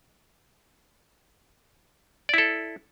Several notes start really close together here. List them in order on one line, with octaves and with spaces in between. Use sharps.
D5 E4 A4